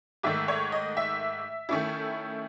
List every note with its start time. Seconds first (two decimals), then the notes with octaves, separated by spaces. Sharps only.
0.23 G#2 D#3 A3 E5
0.48 C#5
0.72 D#5
0.97 E5
1.69 D#3 A3 C#4 E4